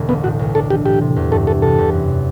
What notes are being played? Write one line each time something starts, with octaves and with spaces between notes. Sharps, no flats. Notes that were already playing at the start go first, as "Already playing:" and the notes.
Already playing: E1 D3 F#3 A3
A1 B3
A2 F#4
B1
D4 A4
E3 G4
A2 G4
C3
E2
G2 A4
E3 A4
C3 A4
E2
F#2